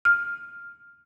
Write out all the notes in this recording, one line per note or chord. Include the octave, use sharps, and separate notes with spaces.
F6